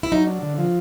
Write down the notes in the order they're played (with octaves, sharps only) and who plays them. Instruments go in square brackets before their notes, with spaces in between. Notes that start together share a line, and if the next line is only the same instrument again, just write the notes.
[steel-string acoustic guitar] E4
[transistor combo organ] F#3 [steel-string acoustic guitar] D#4
[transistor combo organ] D4
D3
F3